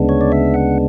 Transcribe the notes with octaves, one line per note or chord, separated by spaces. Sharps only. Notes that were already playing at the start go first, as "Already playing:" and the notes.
Already playing: D2 C#3 G#3 B3 D4
C#5
D5
E5
F#5